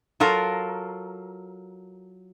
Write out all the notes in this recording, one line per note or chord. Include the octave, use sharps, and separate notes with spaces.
F#3 F4 A4 A#4